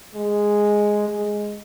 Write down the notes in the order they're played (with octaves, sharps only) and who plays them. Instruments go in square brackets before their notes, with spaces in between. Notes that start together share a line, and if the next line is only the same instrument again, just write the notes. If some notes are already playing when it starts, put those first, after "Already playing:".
[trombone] G#3
G#3